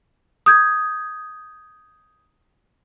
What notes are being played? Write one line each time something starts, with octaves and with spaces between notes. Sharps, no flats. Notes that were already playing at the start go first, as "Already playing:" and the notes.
D#6 G6 G#6